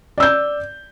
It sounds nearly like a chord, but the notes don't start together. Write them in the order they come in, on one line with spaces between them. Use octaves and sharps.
D5 E6 G6